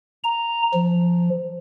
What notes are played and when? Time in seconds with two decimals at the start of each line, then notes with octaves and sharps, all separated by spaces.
0.24 A#5
0.74 F3